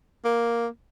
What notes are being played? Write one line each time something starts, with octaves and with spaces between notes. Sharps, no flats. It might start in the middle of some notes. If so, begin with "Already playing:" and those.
A#3